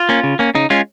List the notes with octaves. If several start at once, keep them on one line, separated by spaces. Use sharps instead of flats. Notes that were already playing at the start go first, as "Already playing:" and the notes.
Already playing: F4
A#3 C#4
C#3
A#3 C#4
C#3 D#4
G#3 C#4 F4